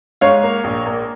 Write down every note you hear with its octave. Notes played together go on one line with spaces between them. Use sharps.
G#2 C#5 F5
A#3
A#1
A#3